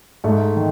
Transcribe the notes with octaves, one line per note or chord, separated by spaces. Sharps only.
G#2 A3
D#3